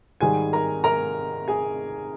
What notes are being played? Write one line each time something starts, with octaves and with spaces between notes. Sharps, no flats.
G#2 D#3 G3 G#4 G#5
A#4 A#5
A#4 A#5
G#4 G#5